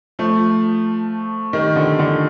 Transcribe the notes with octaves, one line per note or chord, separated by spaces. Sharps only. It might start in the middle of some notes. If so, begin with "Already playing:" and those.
F3 A3
D#3 G3
D3 F3
D3